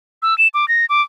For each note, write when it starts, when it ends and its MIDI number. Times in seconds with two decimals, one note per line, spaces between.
0.23 0.37 88
0.38 0.48 100
0.54 0.68 86
0.68 0.86 94
0.89 1.02 86